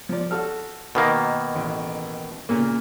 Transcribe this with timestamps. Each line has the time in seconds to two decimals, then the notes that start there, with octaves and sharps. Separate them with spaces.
0.09 F3 D5
0.31 F#4 A4 F6
0.95 B2 D#3 A#3
1.56 A1
2.49 A#2 C#3 A#3